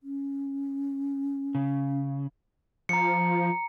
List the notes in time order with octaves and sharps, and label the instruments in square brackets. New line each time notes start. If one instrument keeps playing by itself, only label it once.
[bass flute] C#4
[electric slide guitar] C#3
[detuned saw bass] F3 [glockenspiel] A#5 C#7